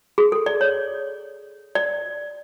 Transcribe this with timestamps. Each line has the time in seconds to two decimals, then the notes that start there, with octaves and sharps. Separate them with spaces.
0.18 G#4
0.32 A4
0.46 D5
0.61 C#5
1.75 D5